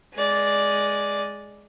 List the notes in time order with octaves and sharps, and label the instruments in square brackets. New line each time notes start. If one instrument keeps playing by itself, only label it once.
[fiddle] G#3 D5